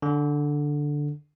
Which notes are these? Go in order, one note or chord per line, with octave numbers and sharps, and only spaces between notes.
D3